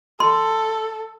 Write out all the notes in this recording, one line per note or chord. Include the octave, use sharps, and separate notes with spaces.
A4 C6